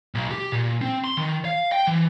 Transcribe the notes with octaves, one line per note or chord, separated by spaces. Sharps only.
B1
G4
A#2
C4
C6
D#3
F5
G5
E3